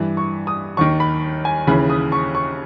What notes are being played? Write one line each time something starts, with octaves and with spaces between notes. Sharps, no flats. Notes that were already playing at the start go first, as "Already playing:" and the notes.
Already playing: G2 E3
C#6
D#6
D#2 D#3 C#6
B5
G#5
D#2 C#3 E3 B5
D#6
C#6
C#6